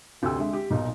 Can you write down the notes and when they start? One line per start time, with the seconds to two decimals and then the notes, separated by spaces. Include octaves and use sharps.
0.22 F1 D2 G4 G5 G#5 E6
0.39 D3 G#3 E5
0.53 G4
0.70 B1 A#2 D#4